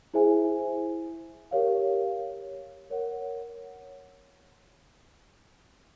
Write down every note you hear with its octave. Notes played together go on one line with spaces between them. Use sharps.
E4 G#4 C5 E5 G#5
G4 A#4 C#5 F5
A#4 C#5 F#5